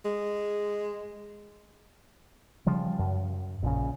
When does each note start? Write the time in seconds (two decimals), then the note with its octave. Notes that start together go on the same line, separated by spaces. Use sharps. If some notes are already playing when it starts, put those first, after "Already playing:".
0.05 G#3
2.66 C#3 F3 G3
2.99 F#2
3.63 A#1 C#3